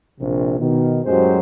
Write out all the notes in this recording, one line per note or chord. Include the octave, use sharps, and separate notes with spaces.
A#1 C3
B2 D#3
F#2 A2 F#3 G#3 G4 C5